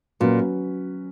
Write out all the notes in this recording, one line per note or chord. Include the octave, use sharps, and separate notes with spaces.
A#2 F#3 C#4 F#4 B4